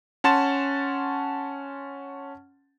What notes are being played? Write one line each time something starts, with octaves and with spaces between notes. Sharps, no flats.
C#4 F#5 A5 C6 A6 E7